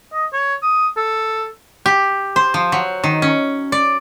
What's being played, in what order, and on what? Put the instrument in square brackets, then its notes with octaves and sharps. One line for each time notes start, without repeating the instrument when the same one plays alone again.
[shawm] D#5
C#5
D#6
A4
[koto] G4
C5
F3
F#3
D#3
C#4
D5